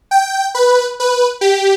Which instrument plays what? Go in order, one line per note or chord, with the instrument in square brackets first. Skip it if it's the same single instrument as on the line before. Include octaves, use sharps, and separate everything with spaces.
[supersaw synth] G5
B4
B4
G4